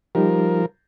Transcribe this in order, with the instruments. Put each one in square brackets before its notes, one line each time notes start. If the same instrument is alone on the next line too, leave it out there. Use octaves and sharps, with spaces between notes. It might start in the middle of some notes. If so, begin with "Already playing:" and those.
[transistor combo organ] F3 A#4 [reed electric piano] G3 D#4 G4